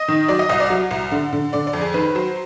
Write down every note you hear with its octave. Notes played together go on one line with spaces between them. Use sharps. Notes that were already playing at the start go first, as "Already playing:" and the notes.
Already playing: D#5
D#3
F#3 D5
D#5
C2 D#5
D5
F#3
C2
D3
D3
D3 D5
D5
F2
G#4
D#3 B4
F#3 C5